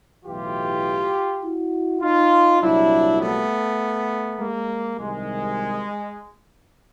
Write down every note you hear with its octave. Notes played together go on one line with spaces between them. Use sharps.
B1 A2 E3 F4 G4
E4 F#4
D#4 F4
C2 A#2 F#3 D4 E4
A3 B3
G#3 A#3
C2 C3 D#3 G#3